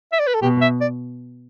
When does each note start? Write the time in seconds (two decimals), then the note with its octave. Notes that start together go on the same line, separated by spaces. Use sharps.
0.13 E5
0.20 D5
0.27 B4
0.34 A4
0.42 B2 G4
0.61 E5
0.81 D5